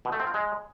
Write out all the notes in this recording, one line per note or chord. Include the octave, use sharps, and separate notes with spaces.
B2
A3
C4
F4
G#3